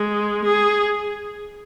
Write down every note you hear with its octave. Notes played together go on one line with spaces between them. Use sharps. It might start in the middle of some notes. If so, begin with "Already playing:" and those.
Already playing: G#3
G#4